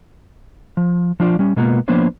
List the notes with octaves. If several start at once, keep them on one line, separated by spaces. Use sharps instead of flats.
F3
F3 D4 F4 D5
G3 C#4
B2 G#3 A#3 B3 F4
F3 A#3 B3 D4 C5 C#5